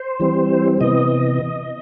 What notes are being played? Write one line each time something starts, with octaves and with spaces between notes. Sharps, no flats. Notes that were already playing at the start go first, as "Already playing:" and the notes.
Already playing: C5
E3 G3 C4
C3 E3 B3 D#5